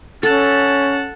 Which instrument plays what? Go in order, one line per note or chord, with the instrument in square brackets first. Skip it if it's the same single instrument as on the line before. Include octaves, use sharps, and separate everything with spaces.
[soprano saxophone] C#4 [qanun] A4 [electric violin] F#5 A5